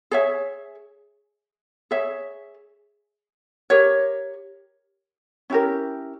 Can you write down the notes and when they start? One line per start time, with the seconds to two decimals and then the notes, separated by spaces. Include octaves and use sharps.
0.11 G#4 C#5 E5
1.91 G#4 C#5 E5
3.70 G4 A#4 C#5
5.50 C#4 E4 G4 A#4